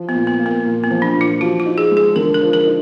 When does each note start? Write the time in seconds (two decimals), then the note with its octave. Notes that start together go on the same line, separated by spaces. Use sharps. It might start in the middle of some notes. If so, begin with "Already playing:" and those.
Already playing: F3
0.09 B3
0.15 A#2
0.27 B3
0.39 A#3
0.46 B3
0.65 A#2
0.83 B3
0.90 F3
1.02 D4
1.16 A#2
1.21 F4
1.40 F3 F#4
1.60 F#4
1.66 D#4
1.78 G#4
1.91 G#3
1.97 G#4
2.16 D3 A#4
2.34 A#4
2.41 F3
2.53 A#4
2.67 D#4